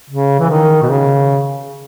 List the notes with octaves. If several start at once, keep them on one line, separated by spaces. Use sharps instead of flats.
C#3
E3
D#3
B2
C#3